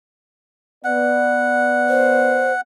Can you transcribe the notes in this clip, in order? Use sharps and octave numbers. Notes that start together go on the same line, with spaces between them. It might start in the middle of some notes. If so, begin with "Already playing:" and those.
B3 D5 F#5
C5